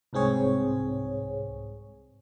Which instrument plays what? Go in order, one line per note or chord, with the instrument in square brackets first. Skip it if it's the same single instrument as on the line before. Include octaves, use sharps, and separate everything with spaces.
[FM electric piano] C2 G#2 C4 G#4 C#5